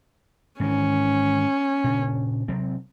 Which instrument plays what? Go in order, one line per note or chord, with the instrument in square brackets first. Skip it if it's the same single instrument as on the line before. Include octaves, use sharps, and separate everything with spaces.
[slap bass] G#2 D#3 E3 [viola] C#4
[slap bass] A#2 C#3 D4
C3 F#3 C4